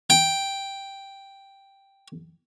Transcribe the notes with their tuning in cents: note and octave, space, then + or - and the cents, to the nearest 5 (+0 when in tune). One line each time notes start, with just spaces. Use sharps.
G5 +0